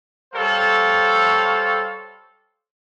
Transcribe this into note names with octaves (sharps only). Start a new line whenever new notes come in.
G3 A4 C5 C#5 F5